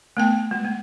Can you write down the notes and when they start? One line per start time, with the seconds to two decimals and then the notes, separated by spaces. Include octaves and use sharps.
0.17 A3 B3 G5
0.51 G#3
0.65 A#3